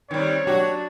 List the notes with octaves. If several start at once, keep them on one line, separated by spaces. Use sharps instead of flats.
D#3 G3 C4 C#5
F#3 D4 F#4 G4 G5